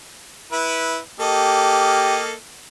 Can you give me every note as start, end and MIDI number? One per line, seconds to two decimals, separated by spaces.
0.52 0.98 64
0.52 0.98 71
1.20 2.33 58
1.20 2.18 67
1.20 2.33 69
1.20 2.33 75